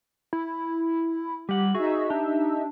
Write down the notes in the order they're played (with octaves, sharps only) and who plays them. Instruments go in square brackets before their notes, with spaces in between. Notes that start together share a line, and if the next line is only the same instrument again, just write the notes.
[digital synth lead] E4
[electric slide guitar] G3 F#5 [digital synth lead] G4
[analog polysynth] D#4 E5 [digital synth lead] F#4 [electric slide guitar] G#4
[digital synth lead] D4 [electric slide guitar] G4